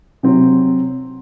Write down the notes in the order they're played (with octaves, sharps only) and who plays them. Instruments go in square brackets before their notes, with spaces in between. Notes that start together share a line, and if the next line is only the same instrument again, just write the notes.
[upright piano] C3 F#3 C4